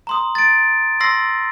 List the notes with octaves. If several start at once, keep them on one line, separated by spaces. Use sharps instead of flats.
A#5 C6 D#6
A6 D7
C6 E6 A#6 C7